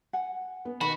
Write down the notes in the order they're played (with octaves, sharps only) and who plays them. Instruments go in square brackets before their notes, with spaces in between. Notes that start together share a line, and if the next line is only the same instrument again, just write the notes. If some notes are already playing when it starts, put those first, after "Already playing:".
[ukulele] F#5 G#5
[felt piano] B3
[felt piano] B2 D#3 B3 [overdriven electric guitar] F#4 [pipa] B5